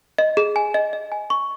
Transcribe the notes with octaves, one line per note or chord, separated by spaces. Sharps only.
D#5
G#4
G#5
D#5
D#5
G#5
C#6